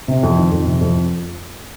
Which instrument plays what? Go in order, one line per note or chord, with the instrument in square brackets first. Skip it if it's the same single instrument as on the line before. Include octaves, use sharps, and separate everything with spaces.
[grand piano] C3
F2
D#3
F2
C3
F2